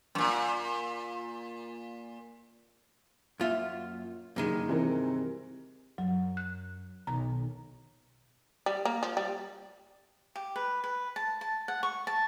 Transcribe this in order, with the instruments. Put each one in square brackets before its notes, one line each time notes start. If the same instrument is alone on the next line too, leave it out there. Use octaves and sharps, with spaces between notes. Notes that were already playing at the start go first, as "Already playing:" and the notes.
[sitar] F#2 A#2
[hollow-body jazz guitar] F#2 F4 E5 [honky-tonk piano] A#2
[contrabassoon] F#1 [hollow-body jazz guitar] G2 D#3 G#3
[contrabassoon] C3 [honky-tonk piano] E3 A#4
[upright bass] F#2 [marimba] F#3
[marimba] F#6
[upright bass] B1 D#3 [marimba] A#5
[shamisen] G3
A#3
F3
G3
[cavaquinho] G4
B4
B4
A5
A5
F#5
C#6
A5